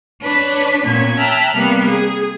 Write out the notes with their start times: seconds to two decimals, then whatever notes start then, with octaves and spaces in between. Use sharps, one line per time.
0.23 D4 B4 C#5
0.83 A#2 B3 C#4 G#6
1.18 E5 G5 A5 A#5 F6 F#6
1.54 C3 G3 A#3 B3
1.89 G#4